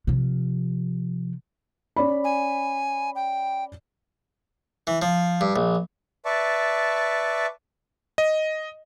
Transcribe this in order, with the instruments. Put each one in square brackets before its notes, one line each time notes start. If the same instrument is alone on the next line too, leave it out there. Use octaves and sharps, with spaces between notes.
[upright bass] C3 F3
[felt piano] C#4 D5 B5
[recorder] G#5
G5
[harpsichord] E3
F3
G2
A#1
[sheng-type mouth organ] B4 D5 E5 A5 C#6
[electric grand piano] D#5